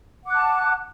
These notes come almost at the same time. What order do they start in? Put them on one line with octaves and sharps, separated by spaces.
F#5 D6 F#6 A5